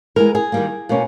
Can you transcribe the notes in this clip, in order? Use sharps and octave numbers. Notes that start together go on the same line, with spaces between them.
E3 G#3 B3 A#4
G#4
D#3 G3 A#3
B2 A#3 C#4